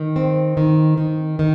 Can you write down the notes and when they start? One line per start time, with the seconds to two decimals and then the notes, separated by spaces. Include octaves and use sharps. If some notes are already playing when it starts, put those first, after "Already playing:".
Already playing: D#3
0.16 C4
0.57 D#3
0.97 D#3
1.39 D#3